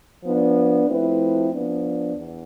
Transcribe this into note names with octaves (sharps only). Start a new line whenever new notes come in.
F3 B3 D4
F3 A3 C4 E4 B4
F3 B3 D4
E2